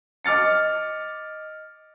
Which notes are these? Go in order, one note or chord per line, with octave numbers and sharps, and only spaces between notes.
D#5 D6 F6 A6 C#7